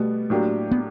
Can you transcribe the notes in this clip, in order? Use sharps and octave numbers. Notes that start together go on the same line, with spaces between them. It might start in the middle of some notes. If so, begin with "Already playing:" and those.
Already playing: B2 G3 A3 B3
A2 F#3 A#3 D4 G4
B3